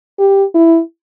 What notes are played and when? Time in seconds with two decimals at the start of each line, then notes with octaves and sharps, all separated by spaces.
0.19 G4
0.55 E4